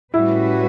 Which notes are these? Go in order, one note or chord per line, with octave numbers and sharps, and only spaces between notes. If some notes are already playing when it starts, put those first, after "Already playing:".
A2 G3 C#4 E4 F#4 B4